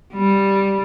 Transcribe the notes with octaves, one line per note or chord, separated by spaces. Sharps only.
G3